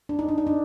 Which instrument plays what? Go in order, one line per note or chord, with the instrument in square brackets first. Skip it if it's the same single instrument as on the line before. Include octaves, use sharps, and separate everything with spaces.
[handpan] D4
D#4
D4
D#4
D4